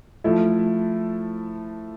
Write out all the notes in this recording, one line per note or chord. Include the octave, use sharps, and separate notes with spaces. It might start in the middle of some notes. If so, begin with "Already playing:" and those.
F3 A3 E4